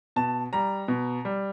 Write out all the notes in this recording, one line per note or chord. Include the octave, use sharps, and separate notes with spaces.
B2 A5
G3 A#5
B2
G3